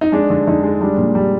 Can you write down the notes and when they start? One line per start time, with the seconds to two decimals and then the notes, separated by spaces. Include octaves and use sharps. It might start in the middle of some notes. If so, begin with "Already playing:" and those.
0.01 D#4
0.12 G#3 D4
0.30 D3
0.47 D3 D#4
0.63 G#3
0.81 G3 D4
0.98 A#2
1.15 G3